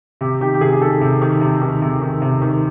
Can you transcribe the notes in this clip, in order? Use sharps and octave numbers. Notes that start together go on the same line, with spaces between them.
C3 G4
D#3 G4
G4
C3 G#4
G#4
D#3 A4
C3
D#3
C3
D#3
C3
D#3
C3
D#3